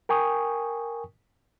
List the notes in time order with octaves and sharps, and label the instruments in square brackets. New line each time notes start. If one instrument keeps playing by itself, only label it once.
[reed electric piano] A#4 G5 G#5 C#6 D#6